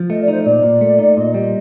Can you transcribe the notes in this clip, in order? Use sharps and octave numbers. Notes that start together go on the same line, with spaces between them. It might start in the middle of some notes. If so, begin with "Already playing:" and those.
Already playing: F3
A3 D#5
D5
D#4 C5
A#2 D5
A#2
A3
D#4
A#2 D#5
G3